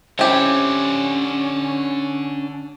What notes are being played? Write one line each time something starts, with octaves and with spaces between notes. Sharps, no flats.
D3 C4 C#4 E4 G4 C#5